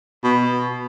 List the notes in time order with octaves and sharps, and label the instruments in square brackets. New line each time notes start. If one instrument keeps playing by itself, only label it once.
[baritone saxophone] B2